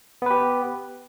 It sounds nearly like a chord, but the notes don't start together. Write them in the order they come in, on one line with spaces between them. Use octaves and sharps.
B3 B4 G4